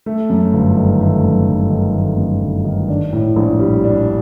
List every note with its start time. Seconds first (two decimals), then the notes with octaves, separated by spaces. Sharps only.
0.06 A3
0.30 F#2
0.53 G1
0.77 D#3
1.01 A3
1.24 F#2
1.48 G1
1.70 D#3
1.95 A3
2.18 F#2
2.42 G1
2.65 D#3
2.88 D4
3.13 A2
3.36 A#1
3.60 G3
3.84 D4